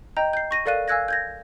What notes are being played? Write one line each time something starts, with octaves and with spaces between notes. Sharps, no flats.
D#5 G5 A#5 G6
G6 C7
C#6 A#6 D#7
A4 A#4 D5 F5 F#6 D#7
F5 G#5 E6 F#6 G#6 A#6
G6 G#6 A#6